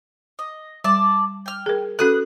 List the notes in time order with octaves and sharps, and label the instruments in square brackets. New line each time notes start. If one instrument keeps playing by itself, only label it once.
[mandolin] D#5
[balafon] G3 [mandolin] D5 A5
[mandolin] G5 F6
[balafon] G#4 A#4
[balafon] C#4 F#4 A4 [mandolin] B4 D#6 F#6